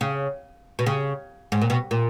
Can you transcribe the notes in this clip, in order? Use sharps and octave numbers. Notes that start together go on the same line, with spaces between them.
C#3
B2
C#3
G#2
A#2
B2
A#2